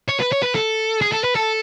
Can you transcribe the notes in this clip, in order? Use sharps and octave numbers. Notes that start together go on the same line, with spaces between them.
C#5
B4
C#5
B4
A4
G#4
A4
B4
A4